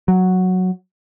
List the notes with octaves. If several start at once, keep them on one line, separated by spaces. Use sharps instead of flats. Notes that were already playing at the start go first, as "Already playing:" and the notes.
F#3